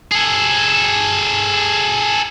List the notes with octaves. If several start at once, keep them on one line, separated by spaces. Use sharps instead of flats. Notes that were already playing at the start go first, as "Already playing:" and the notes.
G#4 A4